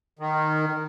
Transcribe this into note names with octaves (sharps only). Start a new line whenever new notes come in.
D#3